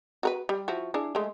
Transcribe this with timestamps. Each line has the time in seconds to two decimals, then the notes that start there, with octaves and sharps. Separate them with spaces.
0.23 F#4 A#4 B4
0.49 G3
0.68 F3 E4 F#4
0.94 D4 E4 G#4
1.15 G#3 A3